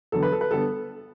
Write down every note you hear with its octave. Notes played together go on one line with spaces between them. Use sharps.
E2 D3 F#3 B3 A4
B4
A4
B4
D3 G3 B3 A4